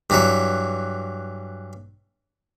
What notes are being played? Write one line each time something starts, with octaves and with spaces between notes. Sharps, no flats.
G2 E3 F#3 E5